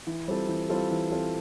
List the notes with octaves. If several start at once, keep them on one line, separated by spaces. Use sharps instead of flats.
E3
G3 C4 F4 A4
E3
G3 C4 F4 A4
E3
G3 C4 F4 A4